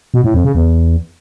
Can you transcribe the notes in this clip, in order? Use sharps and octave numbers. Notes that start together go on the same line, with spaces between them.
B2
A2
F2
C#3
E2